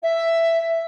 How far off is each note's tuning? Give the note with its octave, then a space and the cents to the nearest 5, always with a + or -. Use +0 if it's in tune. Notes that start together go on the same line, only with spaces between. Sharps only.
E5 +10